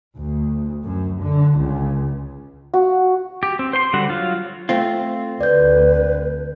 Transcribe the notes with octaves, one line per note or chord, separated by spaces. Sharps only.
D2
F#2
D3
C#2
F#4
G4
C4
C5 C6
D3 G3 F#4 F#5
F#3 F4
A3 C4 F4
D2 B4 D5 G6